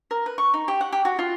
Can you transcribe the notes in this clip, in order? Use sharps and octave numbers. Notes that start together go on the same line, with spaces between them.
A#4
B4
C#6
D#4
G4
F#5
G4
F#4
F4